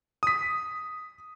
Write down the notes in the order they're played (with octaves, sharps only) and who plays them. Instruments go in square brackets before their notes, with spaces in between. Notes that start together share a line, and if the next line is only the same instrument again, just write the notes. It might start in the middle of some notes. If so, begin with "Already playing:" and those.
[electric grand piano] D#6 B6